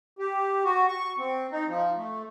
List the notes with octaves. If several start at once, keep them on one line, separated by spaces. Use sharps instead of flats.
G4
F#4
C#6
C4
D#4
F3
A3